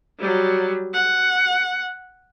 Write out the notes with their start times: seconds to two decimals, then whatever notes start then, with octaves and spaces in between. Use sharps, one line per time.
0.19 F#3 G3
0.94 F#5